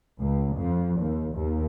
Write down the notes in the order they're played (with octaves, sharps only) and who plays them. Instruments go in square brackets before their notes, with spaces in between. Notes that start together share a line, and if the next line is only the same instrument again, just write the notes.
[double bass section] C#2
F2
D#2
D#2